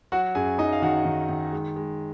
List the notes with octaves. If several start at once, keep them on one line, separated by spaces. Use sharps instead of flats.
F#3 F#4 F#5
F#2 G#4 G#5
F#2 D#4 D#5
F5
D#3 F#4 F#5
D#3
D#3
G#3
G#3